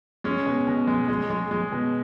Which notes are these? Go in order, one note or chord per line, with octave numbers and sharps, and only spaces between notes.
G#3 C#4
B2
B2
G#3
G#3
G#3
G#3
B2